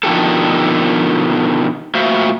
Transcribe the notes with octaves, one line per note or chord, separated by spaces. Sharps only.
B2 D3 D#3 F3 G4 A4
A#2 A3 F#4 C5 E5 F5